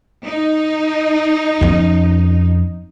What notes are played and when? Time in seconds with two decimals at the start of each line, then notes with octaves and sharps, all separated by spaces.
0.25 D#4
1.61 F2 C#4